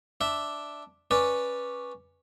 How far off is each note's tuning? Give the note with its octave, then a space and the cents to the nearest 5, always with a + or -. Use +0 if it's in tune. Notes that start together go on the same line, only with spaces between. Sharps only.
D4 +0 E5 +0
C#4 -5 B4 -10 D5 +0